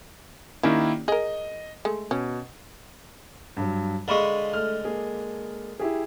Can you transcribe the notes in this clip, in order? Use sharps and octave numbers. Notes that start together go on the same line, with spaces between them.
D#3 A#3 C#4 D4 E4 G4
G#4 A#4 D#5
G#3 A3
B2 C#4
G2 F#3
D3 G#3 F5 B5 C#6
A3 F6
A#3 G#4
E4 G4 G#4